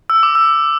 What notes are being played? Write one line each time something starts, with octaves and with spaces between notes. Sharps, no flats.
E6
D6
E6